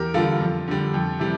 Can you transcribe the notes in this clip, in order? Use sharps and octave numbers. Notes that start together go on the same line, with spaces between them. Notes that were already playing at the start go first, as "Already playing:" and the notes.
Already playing: E2 G4 A#4
D3 G3 F4 A4
F2
D3 G3
F2
C3 E3 G3